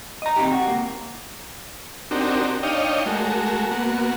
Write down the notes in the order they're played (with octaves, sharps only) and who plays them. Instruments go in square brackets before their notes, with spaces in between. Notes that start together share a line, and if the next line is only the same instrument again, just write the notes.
[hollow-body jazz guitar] D#5 A#5
D2 C4 D#4 G4
F#4
C#2 A#3
[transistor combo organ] C4 D4 D#4 F#4 G4 A#4
D4 D#4 C#5 D#5 F5 G5
G#3 A3 F#4 A#4
A#3 B3 F#4